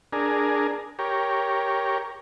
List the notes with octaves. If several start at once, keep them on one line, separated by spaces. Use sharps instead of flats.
D4 G#4 A#4
G4 A#4 C#5